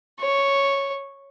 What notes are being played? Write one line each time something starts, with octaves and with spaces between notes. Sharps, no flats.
C#5